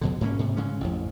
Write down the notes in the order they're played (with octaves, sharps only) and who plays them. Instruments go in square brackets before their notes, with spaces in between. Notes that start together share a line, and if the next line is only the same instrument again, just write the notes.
[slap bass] F2 B2 D3
G#2 A#3 C4 C#4
G#2 C3
C#3 G#3 C#4
A1 F2